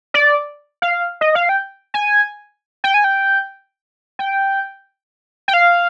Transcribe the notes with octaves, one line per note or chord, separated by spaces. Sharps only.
D5
F5
D#5
F5
G5
G#5
G5
G#5
G5
G5
G5
F5